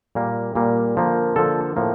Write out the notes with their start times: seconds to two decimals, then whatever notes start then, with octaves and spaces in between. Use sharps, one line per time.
0.15 A#2 G3 A#3
0.55 A#2 G3 A#3
0.96 D3 F3 A#3
1.36 D3 F3 A#3 A4
1.76 A2 F3 A#3